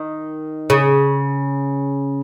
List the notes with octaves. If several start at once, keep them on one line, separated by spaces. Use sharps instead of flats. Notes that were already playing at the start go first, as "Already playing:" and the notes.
Already playing: D#3
C#3